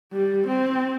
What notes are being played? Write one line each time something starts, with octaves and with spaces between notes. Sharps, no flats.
G3
C4